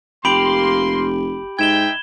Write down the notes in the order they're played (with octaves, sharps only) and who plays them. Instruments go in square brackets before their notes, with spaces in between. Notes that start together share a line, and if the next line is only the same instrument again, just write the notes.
[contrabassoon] F1 [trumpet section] A#3 C6 [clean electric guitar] G4 [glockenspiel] B5 D7 F#7
[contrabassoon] G#2 [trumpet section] D#4 E5 G5 [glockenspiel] G#6 E7 G7